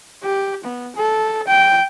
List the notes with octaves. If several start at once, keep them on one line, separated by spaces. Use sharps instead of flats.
G4
B3
A4
G5